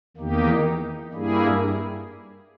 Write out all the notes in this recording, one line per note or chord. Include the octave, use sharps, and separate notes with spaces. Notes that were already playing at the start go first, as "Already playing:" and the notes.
E2 D#3 A#3 D#4 G4
G2 G3 A#3 E4 G#4